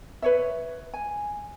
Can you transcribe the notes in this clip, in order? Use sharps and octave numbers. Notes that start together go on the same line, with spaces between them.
B4 C#5 E5
G#5